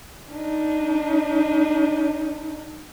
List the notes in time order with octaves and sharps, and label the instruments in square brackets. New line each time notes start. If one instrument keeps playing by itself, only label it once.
[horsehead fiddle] D4 D#4